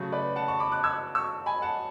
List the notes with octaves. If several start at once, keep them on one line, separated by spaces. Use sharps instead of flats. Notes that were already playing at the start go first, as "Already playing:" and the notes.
Already playing: C#3 F#3 A3
B4 D5
F#5 A5
A5 C#6
B5 D6
D6 F#6
E6 G#6
C#6 E6
G#5 B5
F#5 A5